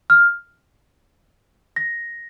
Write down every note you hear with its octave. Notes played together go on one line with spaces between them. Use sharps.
F6
A#6